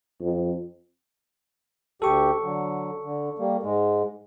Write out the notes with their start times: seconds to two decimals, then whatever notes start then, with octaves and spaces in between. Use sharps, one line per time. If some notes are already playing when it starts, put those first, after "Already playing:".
0.21 F2
2.02 D2 G4 A4 C#6
2.43 D3 F#3
3.04 D3
3.39 G3 A#3
3.63 G#2 G#3